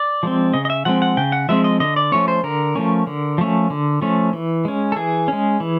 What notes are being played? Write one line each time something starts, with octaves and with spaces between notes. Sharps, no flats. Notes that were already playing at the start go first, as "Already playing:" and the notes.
Already playing: D5
F3 G#3 C4
C#3 D#5
D#5
E5
F3 G#3 C4 F#5
F#5
C#3 G5
F#5
F3 G#3 C4 E5
D#5
D3 D#5
D5
F3 A3 C#4 C#5
C5
D3 A#4
F3 A3 C#4
D3
F3 A3 C#4
D3
F3 A3 C#4
E3
G#3 C#4
A4
E3 G#4
G#3 C#4
E3